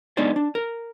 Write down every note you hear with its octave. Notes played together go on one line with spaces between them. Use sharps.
G#3 B3 D4 D#4 C5 D5
D4
A#4